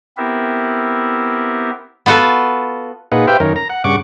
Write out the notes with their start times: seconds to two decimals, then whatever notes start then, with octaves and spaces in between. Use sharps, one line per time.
0.17 B3 C4 E4 G4 A#4 E5
2.06 B3 F4 F#4 A4 B4
3.12 A#2 D#4 F4 G#4 B4 F#5
3.27 G4 B4 C5 E5 F5 G5
3.40 F#2 D#3 C#4 A#4
3.56 A#5
3.70 F#5
3.84 G2 C#3 F#5 C#6 D6